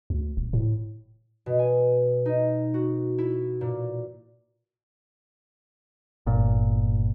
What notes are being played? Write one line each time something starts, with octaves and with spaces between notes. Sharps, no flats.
D2
D#1
A2
B2
G#5
D#4
F#4
E4
A#2
G1 A#2